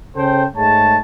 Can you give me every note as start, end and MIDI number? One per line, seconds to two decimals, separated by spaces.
0.16 0.45 49
0.16 0.45 61
0.16 0.45 69
0.16 0.45 72
0.16 0.45 79
0.56 0.98 44
0.56 0.98 56
0.56 0.98 57
0.56 0.98 73
0.56 0.98 81